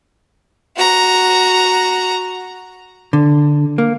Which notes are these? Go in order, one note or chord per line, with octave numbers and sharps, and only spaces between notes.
F#4 A#5
D3
A#3